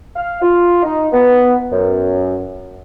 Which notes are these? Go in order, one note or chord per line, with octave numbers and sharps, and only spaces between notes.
F5
F4
D#4
B3
F#2